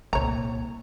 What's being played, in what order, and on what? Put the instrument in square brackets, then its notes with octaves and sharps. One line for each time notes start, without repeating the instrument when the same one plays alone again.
[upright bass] C2 A#2 [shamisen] C#5 A#5